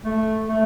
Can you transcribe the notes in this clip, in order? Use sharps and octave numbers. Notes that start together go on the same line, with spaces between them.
A3
A3